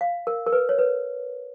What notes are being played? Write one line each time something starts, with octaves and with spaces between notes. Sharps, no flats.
F5
A#4
A#4
B4
C#5
B4